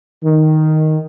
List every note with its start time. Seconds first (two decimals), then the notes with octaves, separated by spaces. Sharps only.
0.24 D#3